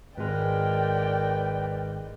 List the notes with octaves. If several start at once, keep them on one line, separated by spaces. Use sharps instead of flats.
G#1 G#3 A#4 B4 D5 G5